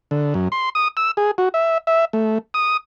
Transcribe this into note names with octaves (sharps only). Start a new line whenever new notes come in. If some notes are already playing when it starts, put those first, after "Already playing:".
D3
F#2
C6
D#6
E6
G#4
F#4
E5
E5
A3
D#6